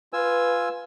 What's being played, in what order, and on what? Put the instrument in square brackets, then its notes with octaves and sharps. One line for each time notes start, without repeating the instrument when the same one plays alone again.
[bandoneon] F4 G#5 E6 [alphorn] B4